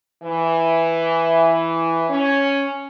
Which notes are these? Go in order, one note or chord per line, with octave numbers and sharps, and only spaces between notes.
E3
C#4